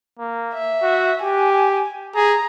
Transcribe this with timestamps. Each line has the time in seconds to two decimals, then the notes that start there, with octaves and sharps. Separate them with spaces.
0.19 A#3
0.53 E5
0.82 F#4
1.23 G4 G#5
2.15 G#4 A#5